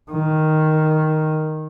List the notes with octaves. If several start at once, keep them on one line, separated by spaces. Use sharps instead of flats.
D#3